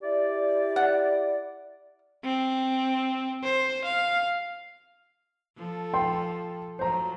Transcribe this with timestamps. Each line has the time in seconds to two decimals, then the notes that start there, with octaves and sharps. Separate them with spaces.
0.02 E4 G4 D5
0.76 F#5
2.24 C4
3.44 C5
3.85 F5
5.57 F3 A4
5.94 G5 C6
6.79 F3 F#3 C5 A#5